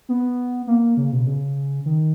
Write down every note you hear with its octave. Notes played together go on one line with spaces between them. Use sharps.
B3
A#3
C#3
B2
C#3
D#3